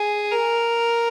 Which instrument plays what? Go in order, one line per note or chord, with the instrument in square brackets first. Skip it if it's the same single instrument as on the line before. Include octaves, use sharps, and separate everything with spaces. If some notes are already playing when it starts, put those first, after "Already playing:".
Already playing: [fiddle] G#4
A#4